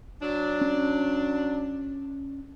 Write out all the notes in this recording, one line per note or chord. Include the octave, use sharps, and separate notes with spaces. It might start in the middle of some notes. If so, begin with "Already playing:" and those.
F#3 D4
C#4